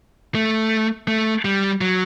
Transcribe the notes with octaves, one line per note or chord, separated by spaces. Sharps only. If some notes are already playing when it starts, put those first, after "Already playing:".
A3
A3
G3
F#3